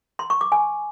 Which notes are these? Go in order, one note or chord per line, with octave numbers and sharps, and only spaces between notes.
C6
C#6
D6
G#5